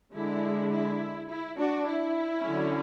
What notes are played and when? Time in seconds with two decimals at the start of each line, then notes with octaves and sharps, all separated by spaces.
0.15 D3 G#3 D4 E4
0.72 E4
1.29 E4
1.57 D4 F#4
1.86 E4
2.43 D3 F#3 C#4